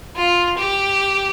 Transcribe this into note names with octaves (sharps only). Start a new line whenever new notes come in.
F4
G4